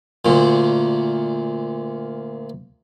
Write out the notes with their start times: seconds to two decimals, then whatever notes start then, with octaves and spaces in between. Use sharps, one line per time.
0.25 D2 A#2